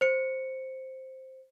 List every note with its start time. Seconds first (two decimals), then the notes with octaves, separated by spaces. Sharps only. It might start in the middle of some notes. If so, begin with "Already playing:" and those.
0.01 C5 C#7